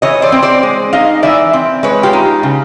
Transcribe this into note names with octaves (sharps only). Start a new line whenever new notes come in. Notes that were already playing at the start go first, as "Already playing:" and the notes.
E3 C#5 D#5
C5 D5
C4
C5 D5
G#3
D#4 D#5 F5
E3 D5 E5
C4
G#3 B4 C#5
F4 G4
D#4
C#3